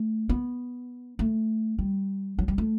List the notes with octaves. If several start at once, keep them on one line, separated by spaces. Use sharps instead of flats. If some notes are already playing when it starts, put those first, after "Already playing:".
Already playing: A3
B3
A3
G3
F#3
G3
A3